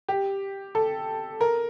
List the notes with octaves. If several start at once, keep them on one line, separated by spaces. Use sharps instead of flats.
G4
A4
A#4